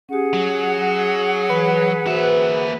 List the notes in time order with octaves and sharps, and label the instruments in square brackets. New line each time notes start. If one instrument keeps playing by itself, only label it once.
[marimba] C#4 G4 [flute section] G#4 F#5
[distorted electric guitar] F#3
[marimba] E3 [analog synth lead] B4
[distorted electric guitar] A#3 E5 [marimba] F#4 C5